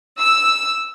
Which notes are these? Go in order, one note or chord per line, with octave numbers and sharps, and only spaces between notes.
E6